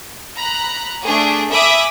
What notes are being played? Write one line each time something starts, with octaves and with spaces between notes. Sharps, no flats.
A#5 B5 F#6
A3 D4 G#4
E5 G#5 B5 D6 D#6